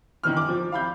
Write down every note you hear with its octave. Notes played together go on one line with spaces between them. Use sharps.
D#3 E3 F6
D6
F3
F5 B5 G6